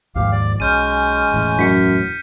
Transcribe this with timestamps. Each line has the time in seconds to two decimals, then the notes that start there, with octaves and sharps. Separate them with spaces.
0.15 D#2 G#2 F3 G4 F5
0.32 D5
0.60 B1 G#3 C#4 F6 G6 D#7
1.32 E1 A2 E3
1.59 F#2 B6 C#7